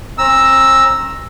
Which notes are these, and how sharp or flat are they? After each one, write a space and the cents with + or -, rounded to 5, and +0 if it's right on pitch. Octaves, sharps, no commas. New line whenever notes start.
C4 +45 A#5 +0 E6 +0